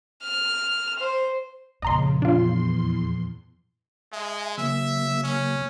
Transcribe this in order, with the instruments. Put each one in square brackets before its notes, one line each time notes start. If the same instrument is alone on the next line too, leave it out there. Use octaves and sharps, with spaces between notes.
[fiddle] F6
C5
[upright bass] F2 A#2 [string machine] C#3 [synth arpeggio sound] D#5 A#5 C6
[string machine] E2 C6 [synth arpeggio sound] D4 F4
[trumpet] G#3 [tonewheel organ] E5 G#5
[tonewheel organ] C#3 F#3 A#3 [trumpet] E5
[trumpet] C#4